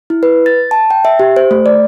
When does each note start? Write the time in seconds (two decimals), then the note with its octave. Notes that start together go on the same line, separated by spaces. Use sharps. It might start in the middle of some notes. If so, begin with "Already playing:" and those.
0.10 E4
0.23 B4
0.46 A6
0.71 A5
0.90 G5
1.05 E5
1.20 G4
1.36 C5
1.51 A3
1.66 D5